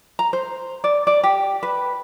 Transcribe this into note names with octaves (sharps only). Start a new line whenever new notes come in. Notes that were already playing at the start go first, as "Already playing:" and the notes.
A#5
C5
D5
D5
G4
B4